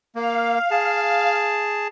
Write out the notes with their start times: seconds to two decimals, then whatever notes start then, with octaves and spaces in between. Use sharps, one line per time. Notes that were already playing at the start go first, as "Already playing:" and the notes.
0.15 A#3 F5
0.71 G#4 A5